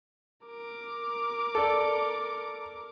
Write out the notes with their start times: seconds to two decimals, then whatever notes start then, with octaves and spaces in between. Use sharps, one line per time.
0.47 A#4 D6
1.55 A4 D5